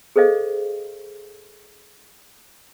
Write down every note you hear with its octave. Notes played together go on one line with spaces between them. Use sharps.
G#4 A4 C5 D#5 F5